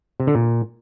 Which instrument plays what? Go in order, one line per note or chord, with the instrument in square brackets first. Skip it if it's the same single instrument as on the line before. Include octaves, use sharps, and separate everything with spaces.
[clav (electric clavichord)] C3
D3
A#2